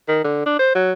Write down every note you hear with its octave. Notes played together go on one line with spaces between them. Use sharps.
D#3
D3
D4
C5
F#3